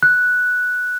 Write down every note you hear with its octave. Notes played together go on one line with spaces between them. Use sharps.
F#6